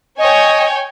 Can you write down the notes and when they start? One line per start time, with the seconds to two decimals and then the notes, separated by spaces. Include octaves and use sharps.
0.18 C#5 D#5 G5 G#5